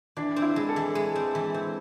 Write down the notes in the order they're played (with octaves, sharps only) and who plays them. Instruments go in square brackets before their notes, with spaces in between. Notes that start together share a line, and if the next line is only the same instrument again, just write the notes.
[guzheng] E3 [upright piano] D4
[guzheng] C4
[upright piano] E4
[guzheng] G#3
[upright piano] A4
[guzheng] E3
G#3
C4
E3
C4